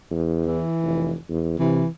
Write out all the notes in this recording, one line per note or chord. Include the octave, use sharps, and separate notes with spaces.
E2
E3
F1
E2
C3 E3